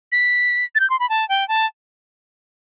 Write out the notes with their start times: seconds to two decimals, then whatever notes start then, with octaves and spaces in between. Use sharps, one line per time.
0.12 B6
0.75 A6
0.80 G6
0.90 C6
1.00 B5
1.10 A5
1.29 G5
1.48 A5